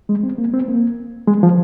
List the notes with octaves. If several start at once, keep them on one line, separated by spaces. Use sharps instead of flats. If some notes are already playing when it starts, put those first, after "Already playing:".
G#3
C4
A#3
C4
A#3
G#3
F3